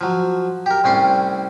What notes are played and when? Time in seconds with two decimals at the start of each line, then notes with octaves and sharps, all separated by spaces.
0.01 F3 F#3
0.66 G4 A#4
0.84 C2 A2 C4 C#4 D5 C6